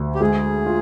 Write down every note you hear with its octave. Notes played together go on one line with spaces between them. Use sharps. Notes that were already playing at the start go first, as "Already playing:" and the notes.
Already playing: D2 D3
G4
G#3 G#4
F4